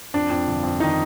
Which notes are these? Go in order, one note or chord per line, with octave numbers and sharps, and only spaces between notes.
F2 D4
F2
G1
F2
D#3 D#4